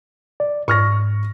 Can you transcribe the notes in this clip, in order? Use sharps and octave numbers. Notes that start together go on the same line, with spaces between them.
D5
G#2 C#6 F6 A#6